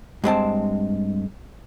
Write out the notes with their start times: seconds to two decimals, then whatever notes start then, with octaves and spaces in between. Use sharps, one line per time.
0.24 G2 G#3 C4 A5